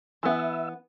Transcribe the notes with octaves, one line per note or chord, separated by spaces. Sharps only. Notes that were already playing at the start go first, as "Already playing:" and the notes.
E3 B3 E5